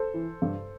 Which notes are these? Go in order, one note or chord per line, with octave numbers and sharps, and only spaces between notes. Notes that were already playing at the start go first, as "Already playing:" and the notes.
Already playing: A4 C5
E3
G2